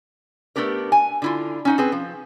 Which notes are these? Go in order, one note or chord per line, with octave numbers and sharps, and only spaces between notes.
A3 B3 D4 G4 A#4
G#5
D3 E4 F4
C#4 D#4 F#5
C4 G#4 B4
F3